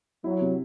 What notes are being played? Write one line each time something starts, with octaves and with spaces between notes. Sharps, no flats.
F#3 E4
C3